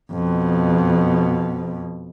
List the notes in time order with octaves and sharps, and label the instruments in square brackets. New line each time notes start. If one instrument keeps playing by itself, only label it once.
[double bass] F2 B2